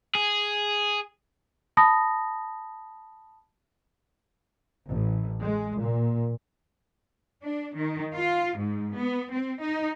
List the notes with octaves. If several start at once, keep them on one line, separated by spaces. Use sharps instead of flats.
G#4
A5 B5 D#6 A#6
A1
G#3
A#2
D4
D#3
F4
G#2
B3
C4
D#4